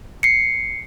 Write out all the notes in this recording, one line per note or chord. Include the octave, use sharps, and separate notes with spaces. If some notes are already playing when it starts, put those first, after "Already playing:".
C7 C#7